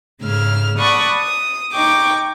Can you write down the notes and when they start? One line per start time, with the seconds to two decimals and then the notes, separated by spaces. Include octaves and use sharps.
0.21 G#2 C#3 E6 F6
0.78 D5 F#5 A5 B5 C#6 D#6
1.17 D#6
1.73 D#4 G5 C#6 D6